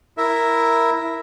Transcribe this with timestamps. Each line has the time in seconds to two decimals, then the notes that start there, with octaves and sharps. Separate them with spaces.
0.18 E4 A#4 E5